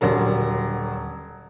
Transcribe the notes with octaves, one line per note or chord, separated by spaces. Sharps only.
D#1 D3 F#3 A#4